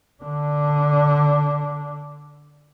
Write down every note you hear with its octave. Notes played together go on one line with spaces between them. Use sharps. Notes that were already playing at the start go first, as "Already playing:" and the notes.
D3 D4